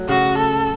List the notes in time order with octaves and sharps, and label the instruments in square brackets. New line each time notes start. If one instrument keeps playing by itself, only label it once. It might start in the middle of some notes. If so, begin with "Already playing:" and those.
Already playing: [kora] F#3 A3
[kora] C#3 [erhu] F#4
[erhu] A4